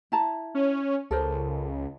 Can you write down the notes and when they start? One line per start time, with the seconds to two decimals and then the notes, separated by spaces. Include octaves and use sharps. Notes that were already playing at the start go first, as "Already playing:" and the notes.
0.12 E4 A5 A#5
0.55 C#4
1.11 C#2 A4 A#4 C5